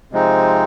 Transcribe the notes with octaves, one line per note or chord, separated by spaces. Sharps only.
C3 F3 G#3 C4 D#4